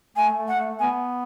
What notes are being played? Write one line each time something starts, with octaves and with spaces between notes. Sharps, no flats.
A3 G#5
A3
F#5
A3
B3 G#5